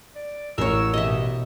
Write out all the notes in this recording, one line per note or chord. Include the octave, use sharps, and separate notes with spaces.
D5
A1 A#4 C#5 E6
B2 G4 D#5 E5